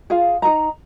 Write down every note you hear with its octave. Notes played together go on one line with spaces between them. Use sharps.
F4 G#4 F5
D#4 G#4 D#5 A#5